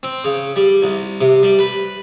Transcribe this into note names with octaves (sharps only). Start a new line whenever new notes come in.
C4
C#3
G3
C2
C3
G3
B4